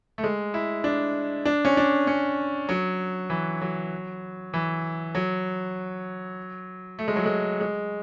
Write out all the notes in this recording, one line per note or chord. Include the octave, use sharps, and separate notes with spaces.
A3
G#3
E4
D4
D4
C#4
D4
C#4
F#3
E3
F#3
E3
F#3
A3
G#3
F#3
G#3
G#3